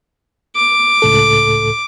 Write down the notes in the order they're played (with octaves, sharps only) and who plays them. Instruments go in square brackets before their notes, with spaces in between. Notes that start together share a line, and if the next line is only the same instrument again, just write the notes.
[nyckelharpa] D6
[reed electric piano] C#2 A2 A4